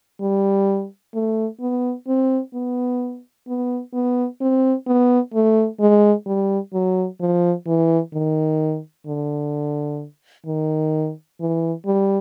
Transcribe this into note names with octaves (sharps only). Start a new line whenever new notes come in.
G3
A3
B3
C4
B3
B3
B3
C4
B3
A3
G#3
G3
F#3
F3
E3
D#3
D3
D#3
E3
G3